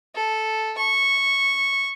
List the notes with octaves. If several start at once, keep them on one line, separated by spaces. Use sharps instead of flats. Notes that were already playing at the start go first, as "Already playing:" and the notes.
A4
C#6